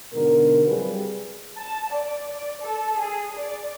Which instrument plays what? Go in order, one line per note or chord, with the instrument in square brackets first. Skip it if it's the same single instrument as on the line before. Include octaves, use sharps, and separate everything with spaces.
[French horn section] G#2 B2 D3 A#4
C3 F#3 G3 F4 G#4 B4
[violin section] A5
D5
D5
A4
G#4
D5